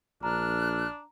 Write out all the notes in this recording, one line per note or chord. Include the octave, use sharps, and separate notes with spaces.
A#1 D4 A#5 F6 F#6